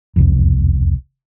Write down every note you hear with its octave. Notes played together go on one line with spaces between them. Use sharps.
E1 C2 F2